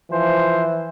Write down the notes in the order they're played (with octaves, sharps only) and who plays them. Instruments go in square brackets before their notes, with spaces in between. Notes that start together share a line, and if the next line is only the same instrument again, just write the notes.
[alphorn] E3 [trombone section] F3 C5